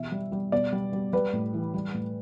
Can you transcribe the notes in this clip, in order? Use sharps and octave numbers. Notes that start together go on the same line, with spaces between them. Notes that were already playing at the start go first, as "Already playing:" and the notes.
Already playing: B2 E3 E5
G3
G3
B2 D5
G3
G3
G3 B4
A2
E3
G3
A2